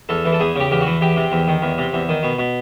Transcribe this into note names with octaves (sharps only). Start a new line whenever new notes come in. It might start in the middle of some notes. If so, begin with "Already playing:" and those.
E2 A4
E3
A4
E2 G#4
C#3 G4
E2 G4
F#4
E3
E2 G4
C3
E2
D#3
E2
C3
E2
D#3
B2
B2